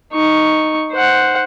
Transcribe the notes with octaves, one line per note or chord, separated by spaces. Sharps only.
D#4 C#6
C5 F#5